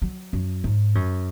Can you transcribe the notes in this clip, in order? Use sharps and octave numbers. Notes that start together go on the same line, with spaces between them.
F#3
F#2
G#2
F#2